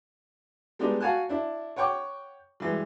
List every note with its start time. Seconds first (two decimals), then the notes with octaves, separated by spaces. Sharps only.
0.79 G3 G#3 B3 D4 D#4
1.00 F#4 F5 F#5 G#5 A5 F#6
1.29 D4 E4
1.76 C#5 F#5 G5 C#6 D6
2.60 G2 E3 G#3